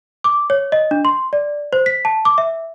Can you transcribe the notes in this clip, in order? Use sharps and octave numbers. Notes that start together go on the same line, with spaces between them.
D6
C#5
D#5
D4
C6
D5
C5
B6
A5
D6
E5